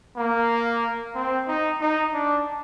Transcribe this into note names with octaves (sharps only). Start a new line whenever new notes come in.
A#3
C4
D#4
D#4
D4